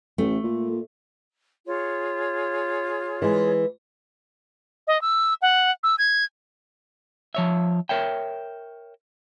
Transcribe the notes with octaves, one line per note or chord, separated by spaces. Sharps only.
A1 A3
A#2
F4 G#4 C#5
E3 G#3
D#5
E6
F#5
E6
G#6
F3 C#5 E5
A#4 C#5 E5 G5